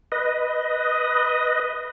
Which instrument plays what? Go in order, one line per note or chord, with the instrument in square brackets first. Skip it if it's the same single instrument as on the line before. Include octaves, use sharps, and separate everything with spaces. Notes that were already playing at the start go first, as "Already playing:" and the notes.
[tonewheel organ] B4 D#5